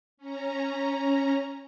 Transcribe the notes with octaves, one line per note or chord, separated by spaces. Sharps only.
C#4 A#5